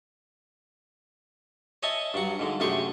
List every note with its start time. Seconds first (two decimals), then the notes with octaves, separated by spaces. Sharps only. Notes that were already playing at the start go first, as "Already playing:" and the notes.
1.83 C#5 D#5 E5 G#5 A5
2.14 G2 F#3 F#5
2.39 G#2 D3
2.60 F#2 C3 A3 G4 G#4 C#6